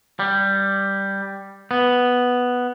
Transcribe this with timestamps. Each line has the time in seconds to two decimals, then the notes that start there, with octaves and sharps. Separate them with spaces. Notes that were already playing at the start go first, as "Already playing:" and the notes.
0.19 G3
1.71 B3